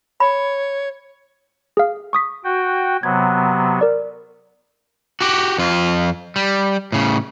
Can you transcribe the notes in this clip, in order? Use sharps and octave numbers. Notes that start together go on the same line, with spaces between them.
C#5 B5
G#4 F5
C#6 D#6 B6
F#4 G5
C3 F#3 B3 G#6
A#4 D5
F#4 G4
F2 F4
G3
A2 C#3